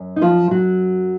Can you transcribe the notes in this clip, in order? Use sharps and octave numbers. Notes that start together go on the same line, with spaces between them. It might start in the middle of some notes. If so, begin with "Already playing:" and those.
Already playing: F#2
D#4
F3 F4
F#3 F#4